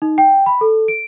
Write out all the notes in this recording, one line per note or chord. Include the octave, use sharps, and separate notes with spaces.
D#4
G5
B5
A4
D7